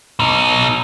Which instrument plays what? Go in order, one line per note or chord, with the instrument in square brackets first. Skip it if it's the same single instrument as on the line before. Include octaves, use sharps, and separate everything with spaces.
[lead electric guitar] B2 D#4